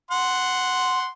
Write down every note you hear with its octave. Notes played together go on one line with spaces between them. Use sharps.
F#5 C6